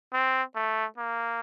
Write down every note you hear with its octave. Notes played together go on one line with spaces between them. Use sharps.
C4
A3
A#3